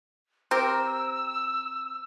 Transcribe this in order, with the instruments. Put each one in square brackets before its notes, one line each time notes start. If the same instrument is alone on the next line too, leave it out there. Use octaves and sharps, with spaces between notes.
[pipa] C4 G4 A#4 [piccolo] E6